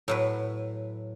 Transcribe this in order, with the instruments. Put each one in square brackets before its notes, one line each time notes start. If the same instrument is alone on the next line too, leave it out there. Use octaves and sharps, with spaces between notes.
[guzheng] A2 F#3 B4